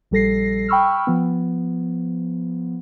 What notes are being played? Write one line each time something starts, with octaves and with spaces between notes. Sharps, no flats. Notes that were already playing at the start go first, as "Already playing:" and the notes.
A#1 G3 A4 A#6 C7
G5 B5 C#6 E6 F6
F3 B3